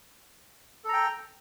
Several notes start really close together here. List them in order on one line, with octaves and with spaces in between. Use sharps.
A4 A#5 G5